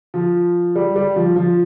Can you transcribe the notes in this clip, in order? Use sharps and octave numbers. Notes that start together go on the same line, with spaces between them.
F3
G3
G3
F3
F3